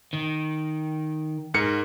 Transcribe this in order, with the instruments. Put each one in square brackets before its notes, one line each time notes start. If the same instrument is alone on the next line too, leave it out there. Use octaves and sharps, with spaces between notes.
[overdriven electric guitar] D#3
[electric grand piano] G#2 A#4 C#7